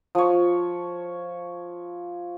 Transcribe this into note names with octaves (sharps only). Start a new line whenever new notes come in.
F3 C#5